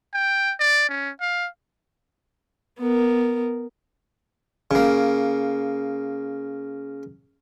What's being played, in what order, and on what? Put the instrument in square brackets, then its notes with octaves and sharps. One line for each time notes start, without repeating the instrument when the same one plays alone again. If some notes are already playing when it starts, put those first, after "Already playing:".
[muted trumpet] G5
D5
C#4
F5
[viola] B3 A#4
[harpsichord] C#3 A#3